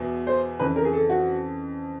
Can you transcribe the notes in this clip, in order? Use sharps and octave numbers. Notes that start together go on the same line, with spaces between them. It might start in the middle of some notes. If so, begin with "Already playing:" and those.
Already playing: E2 B2
C5
F2 C#3 E3 B4
A#4
G#4
A4
F#4